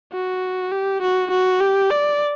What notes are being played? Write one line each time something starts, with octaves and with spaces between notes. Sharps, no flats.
F#4
G4
F#4
F#4
G4
D5